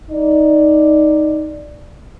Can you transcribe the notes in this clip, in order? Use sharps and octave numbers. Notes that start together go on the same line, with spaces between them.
D#4 D5